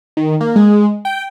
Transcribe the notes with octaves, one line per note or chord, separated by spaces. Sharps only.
D#3
A#3
G#3
G5